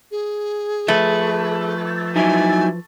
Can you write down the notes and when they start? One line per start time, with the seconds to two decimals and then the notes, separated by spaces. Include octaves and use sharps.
0.11 G#4
0.88 F3 A3 B4
2.16 F#3 D#4 E4 G#5